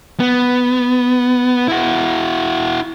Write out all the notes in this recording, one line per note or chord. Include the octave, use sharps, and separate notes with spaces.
B3
E4 F#4